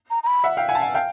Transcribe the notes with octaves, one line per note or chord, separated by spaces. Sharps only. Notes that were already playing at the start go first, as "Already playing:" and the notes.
A#5
A#5
B5
E5 F#5
F5 G5
F#5 G#5
A5
F#5 G#5
F5 G5